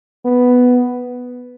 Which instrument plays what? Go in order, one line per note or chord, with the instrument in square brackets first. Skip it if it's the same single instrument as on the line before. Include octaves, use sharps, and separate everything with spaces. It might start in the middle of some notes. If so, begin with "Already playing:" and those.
[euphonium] B3